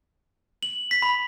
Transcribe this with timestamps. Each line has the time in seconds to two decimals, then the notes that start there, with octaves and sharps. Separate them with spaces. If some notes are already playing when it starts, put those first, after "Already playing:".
0.63 F#7
0.91 B6
1.02 B5